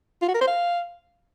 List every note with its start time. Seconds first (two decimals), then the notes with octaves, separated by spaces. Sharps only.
0.22 F4
0.28 F#4
0.35 A#4
0.41 C5
0.47 F5